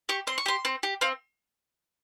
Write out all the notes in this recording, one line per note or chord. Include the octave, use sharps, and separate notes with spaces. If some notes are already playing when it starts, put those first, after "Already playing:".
G4 C#6
C4 C6
C#6
G4 C6
C4
G4
C4 F5